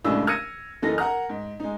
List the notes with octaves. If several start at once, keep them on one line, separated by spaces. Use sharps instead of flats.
C2 A2 C#3 G#3 D4 E6
E6 F6 G#6 A#6 C#7 D#7
F#1 E3 A#3 D#4 A4 A#6
A#4 F#5 A#5 F6
G#2
G#3 D#4